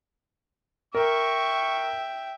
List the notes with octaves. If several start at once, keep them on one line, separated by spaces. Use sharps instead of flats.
A#4 E5 G5 C#6